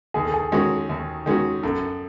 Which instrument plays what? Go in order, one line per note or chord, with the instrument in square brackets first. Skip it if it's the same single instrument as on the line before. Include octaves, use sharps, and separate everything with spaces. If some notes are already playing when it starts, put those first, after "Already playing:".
[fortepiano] D#2 [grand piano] G#4
[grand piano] A4
G#4
[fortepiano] D#3 G#3 C#4 F#4
D#2
D#3 G#3 C#4 F#4
[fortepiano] F#2 [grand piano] A4